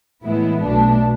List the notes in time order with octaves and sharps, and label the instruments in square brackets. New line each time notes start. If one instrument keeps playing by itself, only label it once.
[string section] A2 E3 G#3 B3 E4
B1 B2 A3 D4